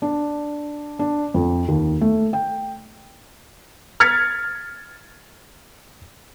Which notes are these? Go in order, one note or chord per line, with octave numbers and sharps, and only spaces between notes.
D4
D4
F2
D#2
A3
G5
F6 G#6 A6 B6 C#7